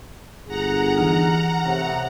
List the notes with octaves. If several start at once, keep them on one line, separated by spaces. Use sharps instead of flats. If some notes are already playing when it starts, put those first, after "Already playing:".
G1 G#4 F#5 A#5
E3 D#4 F6
A2 C3